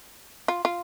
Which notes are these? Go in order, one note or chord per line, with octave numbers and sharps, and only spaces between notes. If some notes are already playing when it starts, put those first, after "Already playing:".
F4
F4